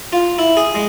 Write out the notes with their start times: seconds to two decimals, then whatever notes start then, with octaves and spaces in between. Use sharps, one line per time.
0.13 F4
0.38 E4
0.57 G#4
0.75 G#3